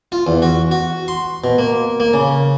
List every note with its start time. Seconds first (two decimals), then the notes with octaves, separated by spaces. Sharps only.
0.12 F4
0.27 E2
0.42 F#4
0.71 F#4
1.08 C6
1.44 B2
1.58 A#3
2.00 A#3
2.13 C#3